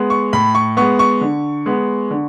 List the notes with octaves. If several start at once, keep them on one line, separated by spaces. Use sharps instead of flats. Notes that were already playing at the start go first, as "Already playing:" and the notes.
Already playing: G#3 B3
C#6
A2 B5
C#6
G#3 B3 C#6
C#6
D3
G#3 B3
D3